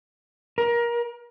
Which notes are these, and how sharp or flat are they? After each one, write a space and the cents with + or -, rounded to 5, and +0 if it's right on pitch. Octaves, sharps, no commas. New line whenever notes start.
A#4 +25